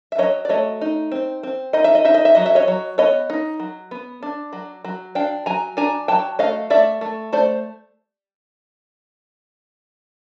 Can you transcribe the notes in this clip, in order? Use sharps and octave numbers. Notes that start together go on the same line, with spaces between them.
E5
F#3 C#5 D#5
D5
A3 C#5 D#5
D#4
C4
C4
D#4 D#5
E5
D#5
D#4 E5
D#5
E5
F#3 D#5
E5
C#5 D#5
F#3
B3 C#5 D#5
D#4
F#3
B3
D4
F#3
F#3
D4 F5 G5
F#3 G#5 A#5
D4 G#5 A#5
F#3 G5 A5
A3 D#5 F5
A3 D5 E5
A3
A3 C5 D5